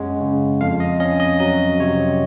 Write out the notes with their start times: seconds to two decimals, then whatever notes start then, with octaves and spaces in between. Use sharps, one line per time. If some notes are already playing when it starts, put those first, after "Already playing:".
Already playing: F#2 G#3 C#4 F#5
0.20 C#3
0.61 F2 F5
0.80 D#5
1.00 C#4 D#5
1.20 D#5
1.40 F#3 D#5
1.80 C3 C#5